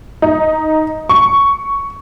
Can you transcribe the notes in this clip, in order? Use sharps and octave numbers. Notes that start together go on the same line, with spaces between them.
D#4
C#6